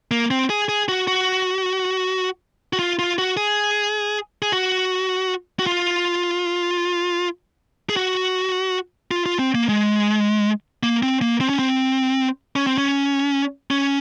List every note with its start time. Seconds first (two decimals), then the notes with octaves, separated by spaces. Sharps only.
0.11 A#3
0.31 C4
0.50 G#4
0.69 G#4
0.88 F#4
1.07 F#4
2.73 F#4
2.79 F4
2.99 F4
3.18 F#4
3.37 G#4
4.42 G#4
4.52 F#4
5.59 F#4
5.67 F4
7.90 G#4
7.97 F#4
9.11 F4
9.26 F4
9.39 C4
9.55 A#3
9.69 G#3
10.83 A#3
11.03 C4
11.21 A#3
11.41 C4
11.49 C#4
11.59 C4
12.56 C#4
12.67 C4
12.78 C#4
13.71 C#4